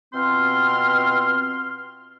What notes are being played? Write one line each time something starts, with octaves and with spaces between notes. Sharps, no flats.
B2 C4 F4 C6 F6